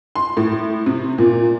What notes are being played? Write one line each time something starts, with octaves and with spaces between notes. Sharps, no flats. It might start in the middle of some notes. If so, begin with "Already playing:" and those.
C6
A2
C3
A#2